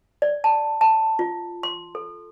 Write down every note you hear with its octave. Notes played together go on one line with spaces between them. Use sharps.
D5
A5
A5
F4
C6
A4